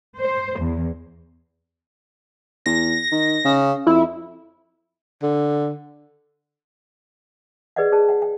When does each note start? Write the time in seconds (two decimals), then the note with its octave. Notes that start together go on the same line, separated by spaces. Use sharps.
0.20 C5
0.60 E2
2.66 E2 A#6
3.11 D#3
3.45 C#3
3.87 F2 E4
5.23 D3
7.76 G#4 B4 D5 D#5 F#5
7.92 G#4 C5 A5
8.09 F#5 G5
8.22 G5